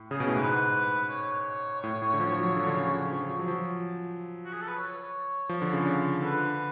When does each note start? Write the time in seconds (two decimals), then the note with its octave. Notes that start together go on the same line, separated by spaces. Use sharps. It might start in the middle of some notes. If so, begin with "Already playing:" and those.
Already playing: A2
0.11 C#3 G#4
0.20 B2
0.28 A2
0.36 G#2 B4
1.10 C#5
1.84 A2
2.02 A2
2.14 D3
2.20 F3
2.32 F3
2.39 F#3
2.56 D3
2.67 D3
2.74 C#3
2.87 F3
2.93 D3
3.11 F3
3.30 F3
3.39 F#3
3.48 F3
4.45 F#4
4.53 G#4
4.61 A4
4.68 B4
4.77 C#5
5.49 F3
5.62 D3
5.73 C#3
5.86 D3
6.22 D3 B4